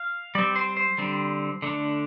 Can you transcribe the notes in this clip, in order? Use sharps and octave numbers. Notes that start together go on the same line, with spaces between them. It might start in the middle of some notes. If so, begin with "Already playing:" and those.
Already playing: F5
G3 C4 D5
C5
C5
D3 G3 C4
D3 A3 D4